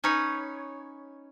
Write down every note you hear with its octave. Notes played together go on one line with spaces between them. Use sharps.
C#4 D#4 B4 C#5